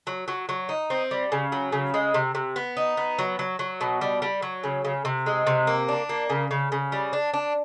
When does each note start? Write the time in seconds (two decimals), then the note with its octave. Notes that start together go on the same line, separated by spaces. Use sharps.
0.07 F#3
0.28 F#3
0.49 F#3
0.69 D#4
0.90 C4
1.11 G3
1.32 C#3
1.52 F#3
1.72 C#3
1.94 G#3
2.14 C3
2.35 C3
2.56 B3
2.77 D#4
2.97 B3
3.19 F#3
3.39 F#3
3.59 F#3
3.81 B2
4.01 G3
4.22 G3
4.42 F#3
4.64 C#3
4.85 C#3
5.05 C3
5.26 G#3
5.47 C3
5.67 A#3
5.88 D4
6.09 A#3
6.30 C#3
6.51 C#3
6.72 C#3
6.92 G3
7.13 D4
7.34 D4